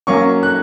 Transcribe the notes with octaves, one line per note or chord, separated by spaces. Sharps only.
F#3 A#3 C#4 C#6
F#6